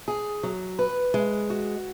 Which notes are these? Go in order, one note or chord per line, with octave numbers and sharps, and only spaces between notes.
G#4
F#3
B4
G#3
F#4